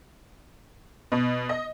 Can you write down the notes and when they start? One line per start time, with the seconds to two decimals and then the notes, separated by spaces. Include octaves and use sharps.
1.12 B2
1.49 D#5